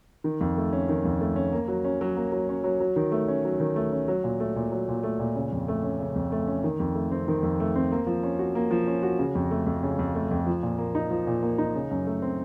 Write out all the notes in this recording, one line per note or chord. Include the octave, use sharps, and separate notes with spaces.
D#3
F2
A3
C#4
D#3
F2
A3
C#4
A#3
F#3
C#4
F#3
A#3
F#3
C#4
F#3
F#3
D#3
A3
C#4
F#3
D#3
A3
C#4
F#3
A#2
A3
A#2
F#3
A#2
A3
A#2
C#3
F2
A3
C#4
C#3
F2
A3
C#4
D#3
F2
A3
C4
D#3
F2
A3
C4
A#3
F3
C#4
F#4
A#3
F3
C#4
F#4
C#3
F2
A3
F2
C#3
F2
A3
F2
F3
A#2
A#3
D#4
F3
A#2
A#3
D#4
C#3
F#2
A3
C4